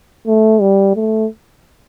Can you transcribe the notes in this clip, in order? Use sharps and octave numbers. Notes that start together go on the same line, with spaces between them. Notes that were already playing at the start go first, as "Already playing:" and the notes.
A3
G3
A3